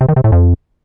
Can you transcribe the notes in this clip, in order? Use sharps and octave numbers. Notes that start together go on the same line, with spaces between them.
C3
D#3
C3
A2
F2